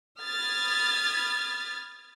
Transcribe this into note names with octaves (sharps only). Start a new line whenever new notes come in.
B5 D#6 F6 G#6 A6